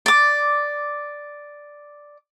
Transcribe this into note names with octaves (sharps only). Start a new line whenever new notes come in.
D5 D6